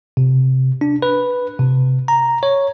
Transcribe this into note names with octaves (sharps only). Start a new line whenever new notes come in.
C3
D4
B4
C3
A#5
C#5